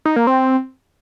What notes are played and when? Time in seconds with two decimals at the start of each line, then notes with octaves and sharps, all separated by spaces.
0.05 D#4
0.16 A#3
0.27 C4